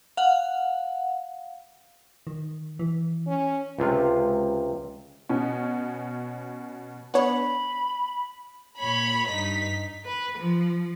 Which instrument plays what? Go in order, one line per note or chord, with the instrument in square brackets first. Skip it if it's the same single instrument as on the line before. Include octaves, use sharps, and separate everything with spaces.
[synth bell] F5 F#5
[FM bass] D#3
E3
[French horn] C#4
[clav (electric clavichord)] C#2 C3 F4
[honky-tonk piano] B2 C#4
[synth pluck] B3 D4 C#5 [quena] B5
[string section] A#2 C#5 B5
G2 D#4 B6
[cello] B4
F3